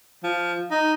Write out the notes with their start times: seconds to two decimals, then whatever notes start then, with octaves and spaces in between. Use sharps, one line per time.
0.23 F3
0.71 D#4